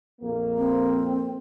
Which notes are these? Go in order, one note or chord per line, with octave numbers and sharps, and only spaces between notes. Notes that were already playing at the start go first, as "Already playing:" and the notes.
A#1 F2 A#3
C4